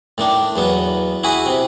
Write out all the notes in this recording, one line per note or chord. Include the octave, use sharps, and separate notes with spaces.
A2 D#3 D4
E2 F#3 B3
E4 F#4 G#4 G#5 B5 C#6
C3